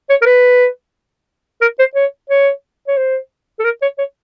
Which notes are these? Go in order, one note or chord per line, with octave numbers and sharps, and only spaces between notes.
C#5
A#4
B4
A#4
C5
C#5
C#5
C#5
C5
A4
A#4
C#5
C#5